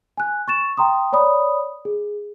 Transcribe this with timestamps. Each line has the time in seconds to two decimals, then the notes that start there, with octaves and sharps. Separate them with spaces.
0.17 G#5 F#6
0.48 C#6 A6 E7
0.77 G5 A#5 C6 D#6
1.13 C#5 D5 B5 D#6
1.85 G#4